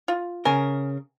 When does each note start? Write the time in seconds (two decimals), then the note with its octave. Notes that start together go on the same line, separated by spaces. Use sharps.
0.08 F4
0.45 C#3 A#4 G#5